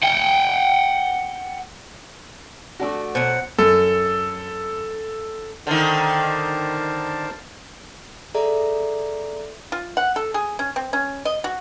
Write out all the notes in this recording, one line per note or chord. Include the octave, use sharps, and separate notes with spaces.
F#5 G5
A3 D4 F#4
B2 F#3 C5 F#5
F#2 A4
D3 D#3 A#4 C5 A5
G#4 A4 D5 E5 A#5
F4
F#5
A4
G#4
C#4
C4
C#4
D#5
F#4